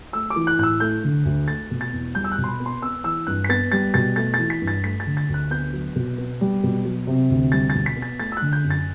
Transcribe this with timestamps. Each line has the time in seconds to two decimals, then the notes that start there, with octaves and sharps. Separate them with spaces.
0.13 A3 E6
0.30 D6
0.36 E3
0.47 F#6
0.58 A2 F#6
0.63 E6
0.80 A3 G6
1.04 D3
1.25 D2
1.48 A3 A6
1.71 B2
1.81 A6
1.92 E2
2.15 G3 G6
2.24 E6
2.32 F#6
2.38 B2
2.44 C6
2.48 B5
2.60 B3
2.66 C6
2.82 B3 E6
3.04 E3 E6
3.27 G2 F#6
3.44 B6
3.49 B3 A6
3.72 G3 A6
3.94 B2 A6
4.16 A3 A6
4.34 E3 A6
4.50 B6
4.62 G2
4.67 A6
4.84 A3 B6
5.00 A6
5.06 D3
5.17 A6
5.29 D2
5.34 F#6
5.50 B3 G6
5.73 F#3
5.96 B2
6.18 B3
6.41 G3
6.63 B2
6.85 F#3
7.07 C3
7.30 D2
7.52 G3 A6
7.70 B2 A6
7.86 B6
7.97 B3
8.02 A6
8.19 A3 A6
8.32 E6
8.37 D3 F#6
8.52 G6
8.64 F#2
8.70 A6